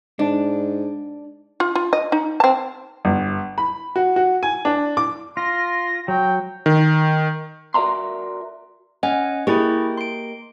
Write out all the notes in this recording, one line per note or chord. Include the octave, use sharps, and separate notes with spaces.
G#2 D4
F4
F4
D#5
D#4
C4 A5
G1
B5
F#4
F#4
G#5
D4
D6
F4 C6 A#6
F#3 G5
D#3
F#4 A#4 D5 E5 A#5 C6
C#4 D#5 F#5 G#5
A#3 E4 G4 G#4 D#5 C#6
C6 D7